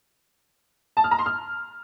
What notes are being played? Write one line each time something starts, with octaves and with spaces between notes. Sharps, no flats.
A5
F6
A#5
C6
F6